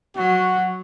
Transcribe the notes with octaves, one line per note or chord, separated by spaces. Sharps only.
F#3 F#4